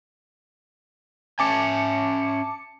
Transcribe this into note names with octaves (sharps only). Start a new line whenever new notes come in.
C#4 E5 G#5 A5 D6 C#7